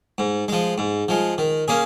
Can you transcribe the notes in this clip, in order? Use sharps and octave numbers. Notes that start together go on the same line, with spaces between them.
G#2
F3 G#3
G#2
F3 G#3
D#3
A#3 C#4 G#4